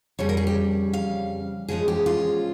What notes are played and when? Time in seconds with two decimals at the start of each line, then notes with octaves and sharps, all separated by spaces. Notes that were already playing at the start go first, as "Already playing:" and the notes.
0.19 F2 C#3 G3 C#4 C#5
0.29 A#4
0.37 G#4
0.47 G4
0.93 F5
1.68 C#3 F3 G#3 C#4 G#4
1.88 G4
2.06 F4